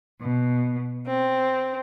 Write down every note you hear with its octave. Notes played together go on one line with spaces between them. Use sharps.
B2
C4